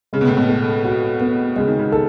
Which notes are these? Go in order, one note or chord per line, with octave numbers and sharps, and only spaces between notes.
C#3 G#3
B2
A2
B2
A4
F#4
B3
C#3 G#3
D#3
C#3
A4